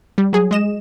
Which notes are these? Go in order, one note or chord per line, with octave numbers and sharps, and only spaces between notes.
G3
F#3 G#4
G#3 D#5 E7